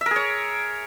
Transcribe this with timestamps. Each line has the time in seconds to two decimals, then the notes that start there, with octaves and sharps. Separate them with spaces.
0.01 E5
0.06 A#4
0.11 G#4
0.16 C#5